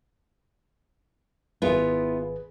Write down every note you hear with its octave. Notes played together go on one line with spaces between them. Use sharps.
G#1 B3 E4 F4 G#4 B4